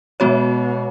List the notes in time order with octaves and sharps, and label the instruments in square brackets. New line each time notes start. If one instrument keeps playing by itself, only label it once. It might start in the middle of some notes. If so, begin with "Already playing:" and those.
[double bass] B2 [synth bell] G#3 B3 F#4 C#5